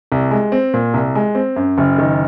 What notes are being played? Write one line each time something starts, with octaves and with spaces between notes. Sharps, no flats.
C2
G#3
C4
A#2
C2
G#3
C4
F#2
F#1
D#3